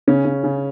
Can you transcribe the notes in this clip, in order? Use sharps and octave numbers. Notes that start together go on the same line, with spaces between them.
C#3 C#4
C#3
C#3